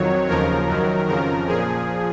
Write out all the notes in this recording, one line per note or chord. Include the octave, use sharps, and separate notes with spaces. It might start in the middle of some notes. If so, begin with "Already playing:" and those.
Already playing: F2 D#3 F#3 C#5
D#2 C#3 F3 A#4
F#2 D#3 F#3
F2 C#3 F3 A#4
A#2 F3 G#4